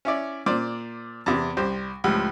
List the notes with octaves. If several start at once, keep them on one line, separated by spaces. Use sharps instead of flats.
C#4 E4 D5
A#2 C5 D5
E2 C3
C2 G4 C5
C#2 A2 F3 G3